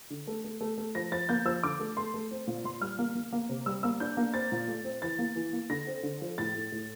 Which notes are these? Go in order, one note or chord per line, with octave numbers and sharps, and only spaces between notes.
D3
A3
A3
A3
A3
F3 A#6
F3 A6
A#3 G6
F3 E6
D3 D6
A3
A3 C6
A3
C4
A#2
A#2 C6
G3 F6
A#3
A#3
A#3
C3
G3 E6
A#3 E6
D4 G6
A#3
C4 A6
A#2
A3
C4
E3 A6
A#3
E3
A#3
D3 A#6
C4
D3
F3
A2 A6
A2
A2